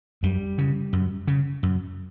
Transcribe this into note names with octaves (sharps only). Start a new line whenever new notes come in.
F#2 G3
C#3
F#2
C#3
F#2